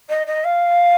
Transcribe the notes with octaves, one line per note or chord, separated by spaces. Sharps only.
D#5
D#5
F5